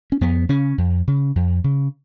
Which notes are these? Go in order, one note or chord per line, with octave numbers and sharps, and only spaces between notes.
C#4
F2 B3
C#3 C#4
F2
C#3
F2
C#3